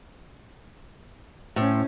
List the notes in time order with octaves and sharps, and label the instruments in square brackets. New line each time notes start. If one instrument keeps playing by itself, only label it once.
[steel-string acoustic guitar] A2 [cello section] C#4 C5